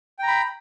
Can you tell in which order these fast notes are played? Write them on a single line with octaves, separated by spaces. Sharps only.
G5 A#5 B5